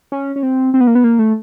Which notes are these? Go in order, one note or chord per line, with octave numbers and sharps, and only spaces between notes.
C#4
C#4
C4
C4
B3
A#3
B3
A#3
A3